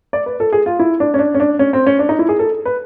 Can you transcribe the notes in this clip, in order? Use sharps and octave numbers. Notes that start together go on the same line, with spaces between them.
D5
B4
A4
G#4
F4
E4
D4
C#4
D4
C#4
D4
C#4
C4
C#4
D4
D#4
E4
G#4
A4
B4